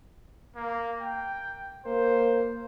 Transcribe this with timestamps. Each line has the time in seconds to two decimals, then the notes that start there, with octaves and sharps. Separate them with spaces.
0.56 A#3
1.01 G5
1.86 A#3 C5